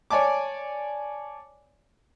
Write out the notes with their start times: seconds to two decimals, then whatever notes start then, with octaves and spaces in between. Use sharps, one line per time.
0.10 C#5 D5 G#5 A5 D6